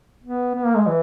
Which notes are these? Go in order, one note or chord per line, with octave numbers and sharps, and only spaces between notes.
B3
B3
A#3
G#3
E3